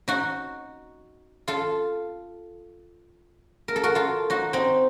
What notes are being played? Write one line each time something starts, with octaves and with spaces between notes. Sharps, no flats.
D#4 F#4
F4 A4
A#4
A4
F#4 A#4
F4 A4
D#4 F#4
C4 D#4